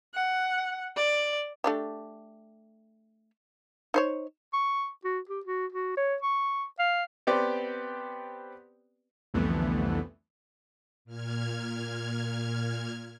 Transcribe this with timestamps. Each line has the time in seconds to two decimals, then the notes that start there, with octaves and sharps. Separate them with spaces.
0.14 F#5
0.96 D5
1.64 A3 D4 G4
3.94 D#4 C5 C#5
4.53 C#6
5.04 F#4
5.29 G4
5.45 F#4
5.72 F#4
5.97 C#5
6.22 C#6
6.79 F5
7.27 B3 C4 G4 B4 D5
9.34 C2 F2 D3 E3 A3 B3
11.05 A#2 F6 G#6